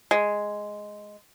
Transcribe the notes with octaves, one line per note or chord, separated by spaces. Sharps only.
G#3